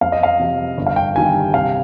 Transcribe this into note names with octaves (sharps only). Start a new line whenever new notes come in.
F2 F5
D#5
F5
C3 F3
G1
F5
G5
G2 D#3 G3 G#5
C2 F5